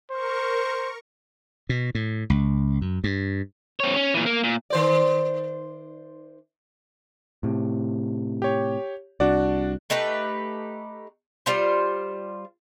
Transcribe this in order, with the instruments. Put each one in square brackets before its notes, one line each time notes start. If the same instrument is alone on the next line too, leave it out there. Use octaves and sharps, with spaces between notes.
[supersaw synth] A#4 C#6 [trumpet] C5
[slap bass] B2
A2
C#2
F#2
G2
[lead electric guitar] C4 C#5
C#4
A#2 E3
A#3
A#2
[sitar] D#3 C5 D5
[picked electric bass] A2 C3
[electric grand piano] G4 C#5
[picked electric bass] C2 [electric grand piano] D4 F#4 D5
[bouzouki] A3 D#4 G4 B4
G3 F4 C5